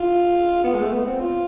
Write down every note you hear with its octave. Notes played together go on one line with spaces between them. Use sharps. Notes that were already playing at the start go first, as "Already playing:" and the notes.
Already playing: F4
B3
G#3
A3
B3
C4
F4